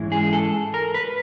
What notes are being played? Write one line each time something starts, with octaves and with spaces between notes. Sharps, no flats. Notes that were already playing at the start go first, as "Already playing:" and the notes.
Already playing: G#2 E3 G#3 C#4 E4
G#4
A4
A#4
B4